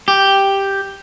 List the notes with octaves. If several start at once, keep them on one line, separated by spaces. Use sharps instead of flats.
G4